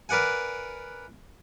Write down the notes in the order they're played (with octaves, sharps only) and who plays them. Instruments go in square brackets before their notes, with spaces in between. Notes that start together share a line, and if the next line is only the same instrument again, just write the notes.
[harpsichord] A#4 B4 D5 F#5 G#5